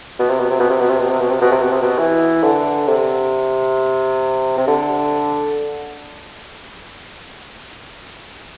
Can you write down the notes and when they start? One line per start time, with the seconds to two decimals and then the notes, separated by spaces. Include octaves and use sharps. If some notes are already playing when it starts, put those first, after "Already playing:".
0.19 B2
0.30 C3
0.40 B2
0.50 C3
0.60 B2
0.70 C3
0.80 B2
0.90 C3
1.01 B2
1.11 C3
1.21 B2
1.31 C3
1.41 B2
1.52 C3
1.62 B2
1.72 C3
1.82 B2
1.98 E3
2.43 D3
2.88 C3
4.58 C3
4.68 D3